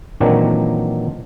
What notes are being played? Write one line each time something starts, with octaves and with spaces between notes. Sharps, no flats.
A#2 D#3 E3 F#3 C4 D4